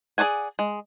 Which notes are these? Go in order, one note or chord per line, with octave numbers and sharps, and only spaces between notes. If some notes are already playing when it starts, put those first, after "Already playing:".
G#4 A4 D5 F#5 G#5
G#3